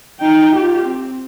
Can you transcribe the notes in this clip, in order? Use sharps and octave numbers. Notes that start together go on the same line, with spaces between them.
D#4 G5
F4 G4
C4